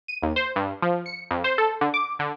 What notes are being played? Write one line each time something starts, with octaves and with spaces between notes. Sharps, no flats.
D#7
D#2
C5
G2
F3
C#7
F2
C5
A4
D3
D6
D3